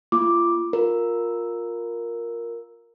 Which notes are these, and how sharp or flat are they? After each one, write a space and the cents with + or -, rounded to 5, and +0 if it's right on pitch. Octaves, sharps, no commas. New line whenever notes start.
A#3 +0 F4 -30 D6 +0
F4 +15 A#4 +0